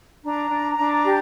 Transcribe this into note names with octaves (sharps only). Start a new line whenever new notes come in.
D4 A#5
D4
D4
G4